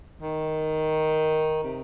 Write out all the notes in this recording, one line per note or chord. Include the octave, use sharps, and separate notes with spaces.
D#3
C3